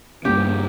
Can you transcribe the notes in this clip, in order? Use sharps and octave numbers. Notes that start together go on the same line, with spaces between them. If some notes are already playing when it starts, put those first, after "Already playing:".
G2 G3 A#3 C#4 G4